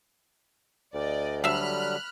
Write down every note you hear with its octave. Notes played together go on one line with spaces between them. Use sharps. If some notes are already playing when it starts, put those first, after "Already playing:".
D2 D5 D#5
D3 F#3 G3 E5 F5 B5 F6 F#6